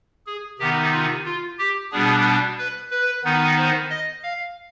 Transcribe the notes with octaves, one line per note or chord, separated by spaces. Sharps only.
G#4
C3 D#3 B3 D#4 G4
F4
F4
G4
B2 G3 B3 D4 G#4
B4
B4
D#3 B3 D#4
C5
D#5
F5